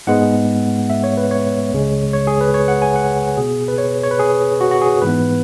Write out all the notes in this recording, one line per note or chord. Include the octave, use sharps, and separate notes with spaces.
G#2 G#3 B3 F#5
E5
C#5
B4
C#5
C#2 C#3 G#3
C#5
G#4
B4
C#5
F#5
G#5
F#5
B2 B3 G#4
B4
C#5
C#5
B4
G#4
F#4
F#4
G#4
G#2 E3 B3 B4